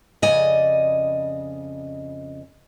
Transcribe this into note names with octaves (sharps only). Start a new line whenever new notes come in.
F2 C#3 D5 D#5 G#5